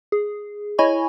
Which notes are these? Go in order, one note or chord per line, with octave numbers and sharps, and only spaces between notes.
G#4
E4 C#5 D#5 G#5 B5 C#6